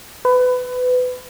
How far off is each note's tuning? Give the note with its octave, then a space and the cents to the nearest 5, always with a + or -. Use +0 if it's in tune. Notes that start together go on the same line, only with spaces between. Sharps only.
B4 +25